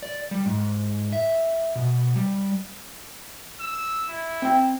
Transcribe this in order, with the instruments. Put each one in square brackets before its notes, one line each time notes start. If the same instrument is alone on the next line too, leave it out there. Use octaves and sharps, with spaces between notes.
[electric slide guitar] D5
G3
G#2
E5
B2
G3
[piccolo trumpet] E6
E4
[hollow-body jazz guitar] C4 G5